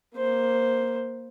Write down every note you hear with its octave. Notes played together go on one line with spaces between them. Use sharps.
A#3 C5